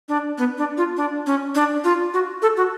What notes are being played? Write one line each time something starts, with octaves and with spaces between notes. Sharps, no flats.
D4
B3
D4
F4
D4
C#4
D4
F4
F#4
A4
F#4